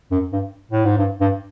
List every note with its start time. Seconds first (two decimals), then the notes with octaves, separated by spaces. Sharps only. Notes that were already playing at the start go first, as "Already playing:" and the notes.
0.11 F#2
0.32 G2
0.71 A2
0.85 G#2
0.98 G2
1.21 G2